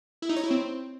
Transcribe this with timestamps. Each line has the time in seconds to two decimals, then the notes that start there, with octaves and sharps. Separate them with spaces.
0.22 E4
0.29 D#4
0.36 C#5
0.43 E4
0.51 C4